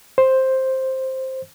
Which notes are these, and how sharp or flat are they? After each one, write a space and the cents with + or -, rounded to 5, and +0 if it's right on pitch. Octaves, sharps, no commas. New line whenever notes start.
C5 +5